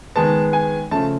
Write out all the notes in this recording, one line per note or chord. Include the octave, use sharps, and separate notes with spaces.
D#3 G#3 B3 A5
G#5
C#3 F3 A3 A5